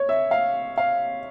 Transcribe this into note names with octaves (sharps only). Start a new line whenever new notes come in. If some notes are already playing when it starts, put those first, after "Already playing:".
Already playing: C#5
E5
F5
F5